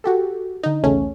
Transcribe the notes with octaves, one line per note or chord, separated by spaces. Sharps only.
F#4 G4 A4
D3 D#4
B1 E2 C#3 A3 C#4